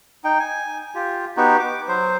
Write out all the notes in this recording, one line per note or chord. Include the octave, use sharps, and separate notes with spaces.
D#4 G5
G#5
F4 G4
B3 D#4 F#4 G4
D6
F#3 C5